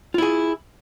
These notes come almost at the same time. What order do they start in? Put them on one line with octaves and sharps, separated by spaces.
F4 E4 G#4